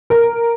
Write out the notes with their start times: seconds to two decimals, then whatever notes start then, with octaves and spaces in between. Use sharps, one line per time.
0.10 A#4